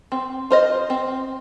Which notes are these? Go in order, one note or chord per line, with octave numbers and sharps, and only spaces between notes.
C4
F4 C5 D#5
C4